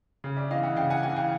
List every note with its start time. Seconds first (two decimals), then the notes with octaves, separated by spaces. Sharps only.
0.24 C#3
0.36 D5 E5
0.50 E3 D#5 F5
0.63 E5 F#5
0.76 C#3 F5 G5
0.90 F#5 G#5
1.03 E3 F#5 G#5
1.16 F5 G5